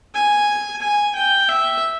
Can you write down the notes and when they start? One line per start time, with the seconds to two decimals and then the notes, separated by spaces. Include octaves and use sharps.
0.14 G#5
0.81 G#5
1.15 G5
1.49 E5